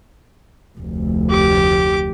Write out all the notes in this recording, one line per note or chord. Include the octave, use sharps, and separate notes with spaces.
F1 D2
G4 D6